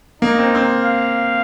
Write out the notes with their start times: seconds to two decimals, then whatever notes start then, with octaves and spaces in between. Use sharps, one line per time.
0.22 A#3 D#4
0.39 C4
0.55 C4
0.72 F5